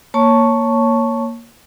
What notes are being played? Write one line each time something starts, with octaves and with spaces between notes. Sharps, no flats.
A#3 C#5 A5 C#6